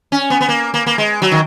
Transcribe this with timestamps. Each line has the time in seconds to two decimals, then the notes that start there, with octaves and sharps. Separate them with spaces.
0.12 C#4
0.30 B3
0.41 B3
0.49 A#3
0.74 A#3
0.86 A#3
0.98 G#3
1.22 F#3
1.31 D#3